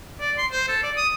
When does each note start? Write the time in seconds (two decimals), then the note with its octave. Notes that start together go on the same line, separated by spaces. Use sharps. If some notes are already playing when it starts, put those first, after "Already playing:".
0.20 D5
0.38 C6
0.52 C5
0.69 A4
0.83 D5
0.97 D#6